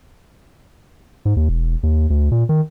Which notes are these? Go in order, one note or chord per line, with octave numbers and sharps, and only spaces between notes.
G#2
D#2
E1
D#2
D2
A#2
D#3